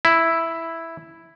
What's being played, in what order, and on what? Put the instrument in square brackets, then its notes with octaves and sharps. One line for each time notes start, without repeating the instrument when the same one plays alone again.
[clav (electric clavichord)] E4